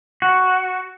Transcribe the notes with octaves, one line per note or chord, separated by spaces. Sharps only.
F#4